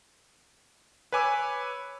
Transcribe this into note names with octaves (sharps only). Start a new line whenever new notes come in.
B4 C#5 G#5 D6 E6